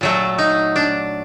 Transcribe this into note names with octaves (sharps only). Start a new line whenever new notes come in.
A#2 F#3 A3
D#4
D4